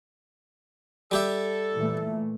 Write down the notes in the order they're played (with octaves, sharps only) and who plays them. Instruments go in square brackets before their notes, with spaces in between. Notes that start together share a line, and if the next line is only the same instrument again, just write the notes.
[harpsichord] G3 G4 E5 [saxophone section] A4
[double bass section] A#2 E3 A3